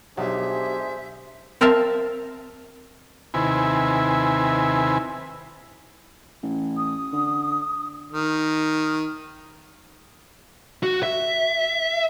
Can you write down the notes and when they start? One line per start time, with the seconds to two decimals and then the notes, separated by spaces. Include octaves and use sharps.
0.17 B1 D4 G4 G#4 C5 E5
1.61 C4 A#4 E5 F5 A5
3.34 D#2 C3 E4 B4 G#5
6.43 A1
6.76 D#6
7.13 D3
8.12 D#3
10.83 F#4
11.03 E5